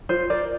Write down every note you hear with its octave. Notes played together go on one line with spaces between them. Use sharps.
F4 C5
A#4 D5